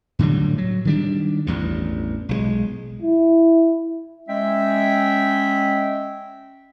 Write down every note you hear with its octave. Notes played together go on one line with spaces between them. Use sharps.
A2 D3 F#3 G3
F#3
D#3 G3 D4
A1 E2 G2
B1 E3 G#3
E4
G#3 C#4 E5 G5